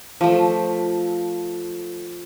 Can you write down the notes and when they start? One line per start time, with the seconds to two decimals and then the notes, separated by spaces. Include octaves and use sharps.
0.21 F3 A3